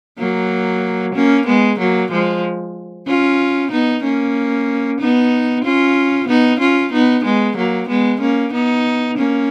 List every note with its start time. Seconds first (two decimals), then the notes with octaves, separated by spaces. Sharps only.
0.18 F#3 A#3
1.15 A#3 C#4
1.46 G#3 B3
1.79 F#3 A#3
2.11 F3 G#3
3.07 C#4 F4
3.71 B3 D#4
4.03 A#3 C#4
5.00 B3 D#4
5.64 C#4 F4
6.28 B3 D#4
6.60 C#4 F4
6.93 B3 D#4
7.24 G#3 B3
7.57 F#3 A#3
7.89 G#3 B3
8.21 A#3 C#4
8.53 B3 D#4
9.18 A#3 C#4